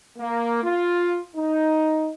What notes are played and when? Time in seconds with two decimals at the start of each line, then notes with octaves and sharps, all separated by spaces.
0.18 A#3
0.63 F4
1.35 D#4